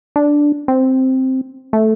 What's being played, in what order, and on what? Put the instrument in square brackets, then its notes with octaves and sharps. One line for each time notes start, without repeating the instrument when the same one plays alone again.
[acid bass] D4
C4
A3